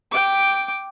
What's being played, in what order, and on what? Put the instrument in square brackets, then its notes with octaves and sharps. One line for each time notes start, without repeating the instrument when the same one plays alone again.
[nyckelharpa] G5 D6